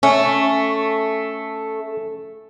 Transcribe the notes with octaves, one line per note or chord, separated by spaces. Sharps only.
A3 C#4